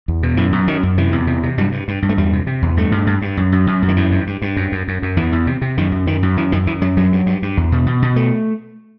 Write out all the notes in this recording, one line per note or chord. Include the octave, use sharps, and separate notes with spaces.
E2
B2
F#2 E3
F#2
F#2 D#3
F#2
C3 E3
E2
C3
C3
G2 F#3
G2
G2
G2
A3
E2 G3
C3
C3
E2
G2 A3
G2
G2
G2
F#2
F#2
F#2
F#2
D#3
G2 E3
G2
G2
G2
F#2
F#2
F#2
F#2
E2 E3
E2
C3
C3
F#2 D#3
F#2
F#2 D#3
F#2
F#2 E3
F#2 D#3
F#2 E3
F#2 F#3
G2 F#3
G2
G2
G2
E2
B2
B2
B2
A3